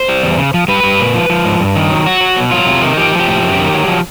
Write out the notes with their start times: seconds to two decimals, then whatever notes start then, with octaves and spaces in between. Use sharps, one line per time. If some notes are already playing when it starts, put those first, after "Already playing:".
Already playing: C5
0.08 G3
0.23 E2
0.38 C#3
0.54 F3
0.68 G3 B4
0.83 G3
0.99 A#2
1.14 F3
1.29 F3
1.45 G#2
1.60 G2
1.76 D#3
1.90 F#3
2.06 F#3 F#4
2.21 F#3
2.37 B2
2.51 F#3 F4
2.66 C3
2.81 D#3
2.97 F3 G4
3.12 F3
3.20 G4
3.27 A2
3.43 F#2
3.59 D#3
3.73 F#3
3.88 F3